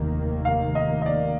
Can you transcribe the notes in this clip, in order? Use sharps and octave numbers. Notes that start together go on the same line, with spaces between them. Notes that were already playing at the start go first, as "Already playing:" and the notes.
Already playing: F1 D#2 D#3 A#3
F5
D#5
D#5
D5